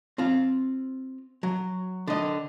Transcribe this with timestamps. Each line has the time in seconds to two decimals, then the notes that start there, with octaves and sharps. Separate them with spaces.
0.18 C4 F4
1.43 F#3
2.07 D3 D#5